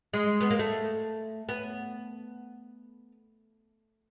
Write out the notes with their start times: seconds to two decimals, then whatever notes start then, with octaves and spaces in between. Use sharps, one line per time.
0.13 G#3
0.41 B3
0.51 A#3
0.59 A3
1.49 B3